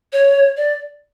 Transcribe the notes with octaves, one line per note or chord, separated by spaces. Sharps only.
C#5
D5